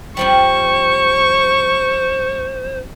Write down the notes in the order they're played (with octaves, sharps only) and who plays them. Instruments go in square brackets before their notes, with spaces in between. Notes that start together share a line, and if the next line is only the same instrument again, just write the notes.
[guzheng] F2 F3 G3 [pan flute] C5 [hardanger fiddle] C#6